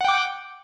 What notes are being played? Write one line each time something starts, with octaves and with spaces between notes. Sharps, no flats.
F#5 G5 D6